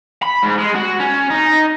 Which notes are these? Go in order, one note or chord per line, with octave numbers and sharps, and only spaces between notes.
B5
G#2
G#3
F#4
C#4
D#4